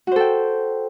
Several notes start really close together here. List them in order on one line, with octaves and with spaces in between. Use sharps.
F#4 C5 A4 G5